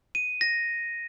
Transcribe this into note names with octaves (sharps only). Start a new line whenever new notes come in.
D#7
A#6